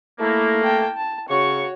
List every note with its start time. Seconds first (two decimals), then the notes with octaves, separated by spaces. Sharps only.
0.19 A3 A#3 E4
0.63 G5 A5
0.97 A5
1.28 C#3 F#4 C#5 C#6